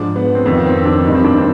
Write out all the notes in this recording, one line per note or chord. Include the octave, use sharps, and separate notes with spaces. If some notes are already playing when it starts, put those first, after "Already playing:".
Already playing: G#2 F3 D4
B3
C4
F2 D#3 B3
C4
D4
G2 D#3 D#4
C4
D4
C4